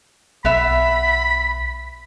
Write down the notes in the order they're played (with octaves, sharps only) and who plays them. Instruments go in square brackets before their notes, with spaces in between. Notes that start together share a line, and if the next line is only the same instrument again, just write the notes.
[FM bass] B1 [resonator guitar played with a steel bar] B3 E5 [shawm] B5